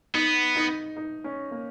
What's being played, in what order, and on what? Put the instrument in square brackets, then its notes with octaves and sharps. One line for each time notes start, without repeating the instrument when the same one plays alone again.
[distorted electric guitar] B3 [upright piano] D#4
[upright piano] D#4
D#4
C#4
A#3